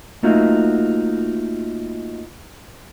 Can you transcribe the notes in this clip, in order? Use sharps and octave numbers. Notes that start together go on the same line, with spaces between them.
A3 A#3 D#4 F4 F#4